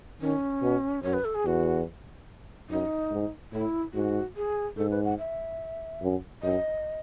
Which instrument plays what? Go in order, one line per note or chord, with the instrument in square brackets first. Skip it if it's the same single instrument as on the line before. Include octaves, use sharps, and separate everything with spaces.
[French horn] D#3 [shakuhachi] C#4
[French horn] B2
[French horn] F#2 [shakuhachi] C#5
[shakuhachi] B4
A4
G#4
[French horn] E2 [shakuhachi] F#4
[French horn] F#2 [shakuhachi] D#4
[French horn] G#2
[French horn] A2 [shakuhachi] E4
[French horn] G#2 [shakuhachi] F#4
[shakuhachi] G#4
[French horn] G#2 [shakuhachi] A4
[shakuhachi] B4
F#5
E5
[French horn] F#2
[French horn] F#2 [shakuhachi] D#5